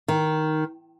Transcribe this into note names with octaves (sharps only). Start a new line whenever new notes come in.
D#3